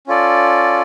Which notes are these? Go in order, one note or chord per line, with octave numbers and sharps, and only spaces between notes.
C#4 F4 A4 D5